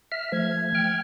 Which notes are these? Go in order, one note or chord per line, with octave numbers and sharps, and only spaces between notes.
E5 F6
F3 A3 G#6
G5 F6